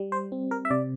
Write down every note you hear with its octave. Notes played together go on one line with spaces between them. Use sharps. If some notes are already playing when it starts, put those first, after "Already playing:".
Already playing: G3
C5
C4
A#4
E5
C3 D5